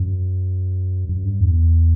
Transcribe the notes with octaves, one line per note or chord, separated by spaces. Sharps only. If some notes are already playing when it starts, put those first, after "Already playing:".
Already playing: F#2
F#2
G2
E2